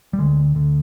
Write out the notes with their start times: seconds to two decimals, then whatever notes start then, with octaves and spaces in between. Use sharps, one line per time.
0.13 G3
0.18 D2 D3 G#3
0.55 D2 D3